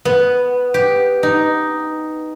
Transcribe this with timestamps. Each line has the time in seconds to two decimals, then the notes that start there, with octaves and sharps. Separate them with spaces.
0.05 B3
0.74 G4
1.23 D#4